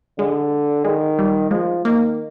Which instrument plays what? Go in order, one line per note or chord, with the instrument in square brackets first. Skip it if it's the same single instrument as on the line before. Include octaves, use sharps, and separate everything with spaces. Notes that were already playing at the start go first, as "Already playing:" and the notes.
[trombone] D3 [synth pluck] G#3
[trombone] D#3 [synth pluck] G#3
[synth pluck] G3
[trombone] F3 [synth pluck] G#3
[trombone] D#3 [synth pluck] A#3